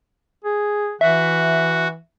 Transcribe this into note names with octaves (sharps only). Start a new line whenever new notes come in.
G#4
E3 F#4 E5